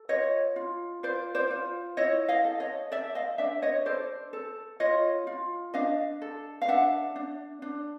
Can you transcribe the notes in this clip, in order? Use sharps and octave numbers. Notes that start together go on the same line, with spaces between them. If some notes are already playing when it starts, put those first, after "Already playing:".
Already playing: A4
F4 C#5 D#5
F4
F4 C5 D5
C5 D5
F4
E4 C#5 D#5
D#5 F5
A4
C#5 D#5
A4 D5 E5
D#5 F5
D4 D5 E5
C#5 D#5
A4 C5 D5
A4
F4 C#5 D#5
F4
D4 D#5 F5
A4
F5
D4 E5 F#5
D4
D4